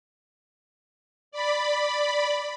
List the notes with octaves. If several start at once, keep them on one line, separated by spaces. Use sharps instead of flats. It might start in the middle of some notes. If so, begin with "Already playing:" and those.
D5 B5